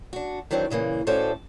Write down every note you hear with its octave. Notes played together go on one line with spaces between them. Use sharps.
D4 F#4
D#3 E3 F#3 C4 D4
A#2 C#3 E3 A#3
A2 C#4 F#4 A4 C5 D5